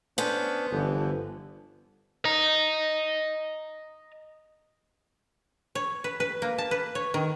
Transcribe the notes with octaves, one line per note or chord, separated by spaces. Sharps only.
B3 C#4 D4 C5
G1 D3 E3 F3
D#5 A#5
C#5
B4
B4
A#3
A5
B4
C#5
D#3